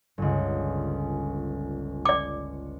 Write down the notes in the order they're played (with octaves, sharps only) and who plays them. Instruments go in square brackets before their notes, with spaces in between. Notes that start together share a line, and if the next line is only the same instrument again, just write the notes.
[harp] G1 C#2
[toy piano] D5 D6 [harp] C#7